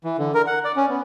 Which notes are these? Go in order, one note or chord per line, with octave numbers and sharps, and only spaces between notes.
E3
D3
A#4
F#5
D5
C#4
B3